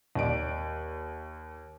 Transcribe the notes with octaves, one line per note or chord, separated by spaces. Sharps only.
D#2 D5 D7